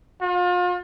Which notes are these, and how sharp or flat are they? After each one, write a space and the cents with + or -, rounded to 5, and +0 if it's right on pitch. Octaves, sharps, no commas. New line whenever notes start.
F4 +35